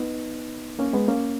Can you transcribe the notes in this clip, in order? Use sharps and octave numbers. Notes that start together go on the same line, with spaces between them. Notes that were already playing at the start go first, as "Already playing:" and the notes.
Already playing: B3 D#4
A#3 C#4
G#3 B3
A#3 C#4